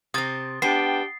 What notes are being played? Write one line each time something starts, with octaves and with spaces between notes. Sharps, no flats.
C3 C4 D#6 A6
B3 D4 G4 G5 C7